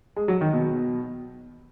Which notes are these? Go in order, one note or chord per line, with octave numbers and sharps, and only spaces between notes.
G#3
F#3
D#3
B2